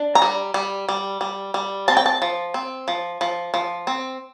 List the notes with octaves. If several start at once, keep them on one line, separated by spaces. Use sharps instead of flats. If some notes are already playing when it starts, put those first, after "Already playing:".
Already playing: D4
A#5
G3
G3
G3
G3
G3
C4 A5
G5
A5
F3
C4
F3
F3
F3
C4